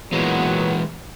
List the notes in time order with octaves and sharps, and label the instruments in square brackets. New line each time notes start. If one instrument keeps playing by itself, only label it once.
[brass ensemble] A#2 F#3 B3 [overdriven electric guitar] E3 G#3